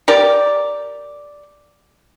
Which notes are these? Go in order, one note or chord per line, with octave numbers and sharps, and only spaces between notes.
G4 A#4 D5